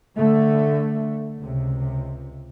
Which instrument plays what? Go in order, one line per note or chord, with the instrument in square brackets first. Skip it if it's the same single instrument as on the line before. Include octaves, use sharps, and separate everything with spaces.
[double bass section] D3 A3
C#2 C3